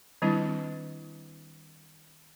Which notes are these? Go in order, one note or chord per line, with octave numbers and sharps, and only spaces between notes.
D#3 G3 C4 D4 E4